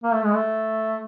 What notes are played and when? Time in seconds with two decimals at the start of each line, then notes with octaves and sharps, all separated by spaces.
0.04 A#3
0.14 A3
0.24 G#3
0.34 A3